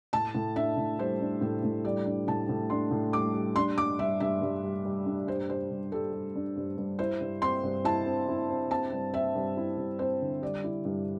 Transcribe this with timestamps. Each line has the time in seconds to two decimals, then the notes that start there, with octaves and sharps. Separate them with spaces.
0.13 A2 A5
0.35 A2
0.56 D4 E5
0.77 A2
0.99 G3 C5
1.21 D4
1.41 A2 A4
1.64 A2
1.84 G3 D5
2.06 D4
2.28 A2 A5
2.49 A2
2.70 D4 C6
2.91 A2
3.13 G3 D6
3.35 G3
3.56 D4 C6
3.77 G2 D6
3.99 G2 E5
4.20 G2 E5
4.42 G2
4.64 G3
4.85 G3
5.06 D4
5.27 G2 C5
5.49 G3 C5
5.70 G2
5.92 G3 A4
6.13 G3
6.36 D4
6.56 G2
6.77 G2
6.99 E4 C5
7.21 G2
7.42 C4 C6
7.64 G2
7.84 E4 A5
8.06 C4
8.29 E4
8.49 C4
8.70 C4 A5
8.92 G2
9.14 C4 E5
9.35 G2
9.57 E4
9.77 G2
9.99 C4 C5
10.21 D3
10.42 G3 D5
10.64 E4
10.85 G2